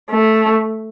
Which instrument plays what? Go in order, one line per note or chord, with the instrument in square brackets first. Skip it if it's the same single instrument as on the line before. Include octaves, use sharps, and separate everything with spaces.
[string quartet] A3